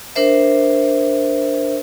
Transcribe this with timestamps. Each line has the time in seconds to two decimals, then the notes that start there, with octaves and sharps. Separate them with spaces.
0.16 D4 A#4 C5 E5